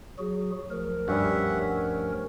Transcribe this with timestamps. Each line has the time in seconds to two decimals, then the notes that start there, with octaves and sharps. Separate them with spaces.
0.18 F#3 F#4 G#4
0.71 D2 F3 A#4
1.08 G2 G3 C#4 E5 F#5
1.76 C#4